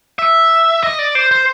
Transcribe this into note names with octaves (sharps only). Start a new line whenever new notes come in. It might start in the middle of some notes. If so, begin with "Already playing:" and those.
E5
D#5
D5
C5
C5